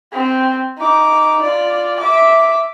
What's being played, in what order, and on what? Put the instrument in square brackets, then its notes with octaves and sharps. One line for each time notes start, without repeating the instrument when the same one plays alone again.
[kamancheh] C4
D#4 D6
F4 D5
E5 D6